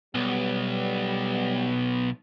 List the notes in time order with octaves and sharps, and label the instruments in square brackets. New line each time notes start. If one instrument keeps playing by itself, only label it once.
[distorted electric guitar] B1 [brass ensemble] G3 [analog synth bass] B3